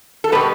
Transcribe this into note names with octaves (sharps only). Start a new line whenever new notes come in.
A4
B2 G3 B3 B4